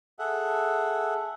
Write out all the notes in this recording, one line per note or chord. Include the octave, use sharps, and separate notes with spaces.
G#4 A4 E5 F#5